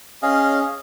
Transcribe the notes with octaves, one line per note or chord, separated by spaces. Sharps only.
C#4 G#4 D#5 F5